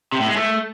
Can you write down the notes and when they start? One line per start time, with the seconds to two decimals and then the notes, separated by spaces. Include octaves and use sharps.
0.12 C3
0.20 A2
0.28 G#3
0.36 A3